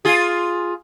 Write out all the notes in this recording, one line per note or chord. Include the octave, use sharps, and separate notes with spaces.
F4 G#4